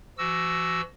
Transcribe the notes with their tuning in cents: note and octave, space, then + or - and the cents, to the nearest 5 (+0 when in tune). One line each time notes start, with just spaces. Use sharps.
F3 -45 F#4 +15 E6 +0